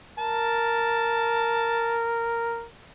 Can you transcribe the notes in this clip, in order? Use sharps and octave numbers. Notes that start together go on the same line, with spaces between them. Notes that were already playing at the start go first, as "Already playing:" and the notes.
A#4 A5